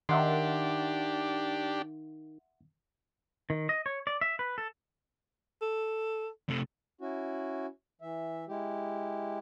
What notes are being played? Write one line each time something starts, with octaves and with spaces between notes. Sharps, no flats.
D#3 D4 G4 E5 F#5 C6
D#3
D#5
C#5
D5
E5
B4
A4
A4
C3 A3
C#4 E4 F#4
E3 E5
G#3 E4 G4